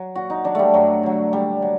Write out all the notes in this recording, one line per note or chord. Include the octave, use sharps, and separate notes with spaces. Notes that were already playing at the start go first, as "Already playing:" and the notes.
Already playing: F#3
A#2 F#4
D#4
F#3 D4
G3 A3
G2 F#3
D3 F#3
A#2 G3
F#3